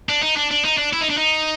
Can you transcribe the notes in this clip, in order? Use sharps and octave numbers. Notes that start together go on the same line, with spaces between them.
D4
D#4
D4
D4
D#4
D4
E4
D#4
D4
D#4